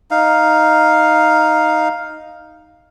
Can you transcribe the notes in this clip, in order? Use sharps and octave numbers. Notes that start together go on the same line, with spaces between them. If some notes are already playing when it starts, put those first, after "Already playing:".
D#4 F5